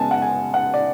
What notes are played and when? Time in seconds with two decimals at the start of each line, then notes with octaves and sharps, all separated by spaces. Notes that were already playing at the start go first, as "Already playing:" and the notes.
Already playing: C#3 G#3 B3 G#5 A5
0.11 F#5
0.22 G#5
0.54 F#5
0.74 D5